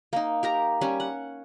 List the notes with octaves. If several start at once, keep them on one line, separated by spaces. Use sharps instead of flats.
A#3 D#4
G4 A#4 A#5
G3 C#4
F#5